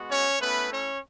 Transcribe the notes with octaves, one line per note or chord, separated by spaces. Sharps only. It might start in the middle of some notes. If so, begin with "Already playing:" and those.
Already playing: G#3 B3 F#4
C#4 C#5
A3 B3 C#4 E4 B4
C#4 C#5